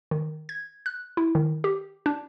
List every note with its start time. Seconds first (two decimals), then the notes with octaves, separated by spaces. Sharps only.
0.11 D#3
0.49 G#6
0.86 F#6
1.17 E4
1.35 D#3
1.64 G4
2.06 D4